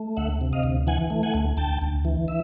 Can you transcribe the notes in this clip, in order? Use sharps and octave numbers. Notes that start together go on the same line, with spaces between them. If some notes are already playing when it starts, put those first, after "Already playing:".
Already playing: A3
D2 E5 F#5
C3
D#5 F5
D2
E3 F#5 G#5
A3
F#5 G#5
D2
D2 G5 A5
D2
E3
E5